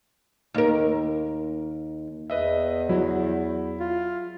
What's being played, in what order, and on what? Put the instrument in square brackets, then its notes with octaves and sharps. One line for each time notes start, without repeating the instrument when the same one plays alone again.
[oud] D#2 A#4
[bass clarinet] E2 [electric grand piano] B4 D#5 E5
[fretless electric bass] F#3 [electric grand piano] E4
[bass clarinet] F4